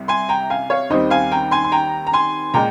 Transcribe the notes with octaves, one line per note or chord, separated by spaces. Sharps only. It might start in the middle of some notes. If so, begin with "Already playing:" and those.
Already playing: C2 C3
G#5 C6
G5 A#5
F5 G#5
C#5 F5
D#2 D#3 G3 C4 C5 D#5
F5 G#5
G5 A#5
G#5 C6
C6
G5 A#5
A#5
G#5 C6
A#2 G#3 G5 A#5